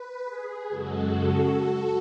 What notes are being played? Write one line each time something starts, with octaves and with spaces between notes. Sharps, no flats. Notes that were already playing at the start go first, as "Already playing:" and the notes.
Already playing: B4
G#4
F#2 C#3 G#3 F#4 A4